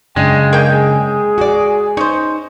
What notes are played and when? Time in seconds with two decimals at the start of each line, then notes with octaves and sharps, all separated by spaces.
0.16 F#2 C#3 G#3 D4 G5
0.53 A#3 G#4 G5
1.38 F#4 D5
1.97 C#4 D#4 C5